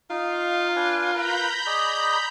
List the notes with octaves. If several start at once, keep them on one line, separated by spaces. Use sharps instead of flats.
D#4 F4 F5
D4 B4 G#5
A#4 B4 F5 A#5 B5 G6
G#4 D5 D#5